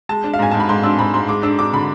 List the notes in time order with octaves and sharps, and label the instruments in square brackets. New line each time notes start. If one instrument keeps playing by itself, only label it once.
[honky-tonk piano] G#3 A5
D4
F5
G#2 G#5
G#2 A5
B5
G#2 C6
D4 E6
G#2 B5
G#2 C6
G#3 D6
D4 E6
D4 D6
D3 B5